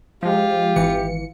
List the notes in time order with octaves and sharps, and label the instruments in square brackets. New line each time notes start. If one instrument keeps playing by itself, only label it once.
[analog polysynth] F3 G#3 [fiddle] F4 [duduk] G4
[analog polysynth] G#1 E3 C#7